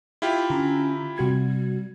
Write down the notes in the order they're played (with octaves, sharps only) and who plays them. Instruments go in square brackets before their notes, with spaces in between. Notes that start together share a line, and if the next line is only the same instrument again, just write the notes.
[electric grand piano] E4 F4 G4
[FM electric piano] D3 A#5 [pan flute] C#4
[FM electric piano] C3 F#4 G#6 [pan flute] G3